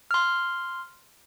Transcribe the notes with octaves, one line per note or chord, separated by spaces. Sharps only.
C6 F6